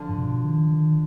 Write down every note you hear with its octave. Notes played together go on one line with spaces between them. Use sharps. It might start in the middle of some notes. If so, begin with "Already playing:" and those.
Already playing: D3 F3
G#2
B2
D#3
D#3